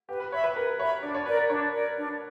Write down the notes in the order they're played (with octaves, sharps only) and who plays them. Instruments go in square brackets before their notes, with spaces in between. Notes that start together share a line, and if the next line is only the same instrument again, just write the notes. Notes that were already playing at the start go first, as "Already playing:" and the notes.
[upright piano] G4 [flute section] B4
[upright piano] B4
[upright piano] C#5 [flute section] E5 B5
[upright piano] B4
[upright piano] A#4 [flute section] B4
[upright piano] C#5 [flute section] E5 B5
[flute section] D4 [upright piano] D5
[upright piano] C#5
[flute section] A#4 D5 [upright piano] B4
[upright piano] A#4
[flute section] D4 [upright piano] C#5
[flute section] A#4 D5
D4